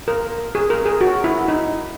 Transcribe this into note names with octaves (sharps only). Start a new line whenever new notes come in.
A#4
G#4
A#4
G#4
F#4
E4
D#4